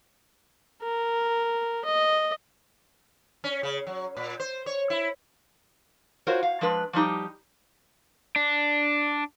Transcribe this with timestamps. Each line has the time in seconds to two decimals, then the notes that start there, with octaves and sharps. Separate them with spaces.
0.83 A#4
1.85 D#5
3.44 C#4
3.63 C#3
3.87 F#3
4.17 A#2
4.40 C5
4.66 C#5
4.90 E4
6.27 F4 F#4 A#4 C5 C#5
6.43 F5
6.61 F3 G#3 D4 B4
6.93 F3 G3 D#4 G4
8.36 D4